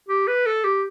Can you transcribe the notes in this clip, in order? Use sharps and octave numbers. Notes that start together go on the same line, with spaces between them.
G4
B4
A4
G4